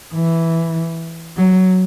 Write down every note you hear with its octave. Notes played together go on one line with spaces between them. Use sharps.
E3
F#3